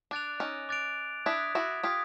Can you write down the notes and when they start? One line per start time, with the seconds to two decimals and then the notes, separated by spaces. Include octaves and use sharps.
0.11 D4 D6 F#6 A6 D7 F7
0.40 C#4 D#4
0.69 D6 F#6 A6 D7 F7
1.26 D4 E4 D#6 G#6 B6
1.55 E4 F#4
1.83 F4 G4 D#6 G#6 B6